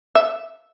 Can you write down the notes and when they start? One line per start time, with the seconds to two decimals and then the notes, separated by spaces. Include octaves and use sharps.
0.15 E5